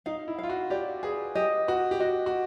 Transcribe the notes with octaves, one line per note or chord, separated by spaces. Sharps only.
D#4 F5
E4
F4 F5
F#4
G4 D5
G#4 B4
G4 D#5
F#4 B4
G4
F#4 D#5
F#4